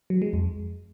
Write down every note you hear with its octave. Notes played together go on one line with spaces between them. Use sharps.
F#3
G#3
F2